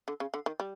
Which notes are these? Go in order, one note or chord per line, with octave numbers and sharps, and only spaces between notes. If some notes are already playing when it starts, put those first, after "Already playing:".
D3
C#3
D3
D#3
G3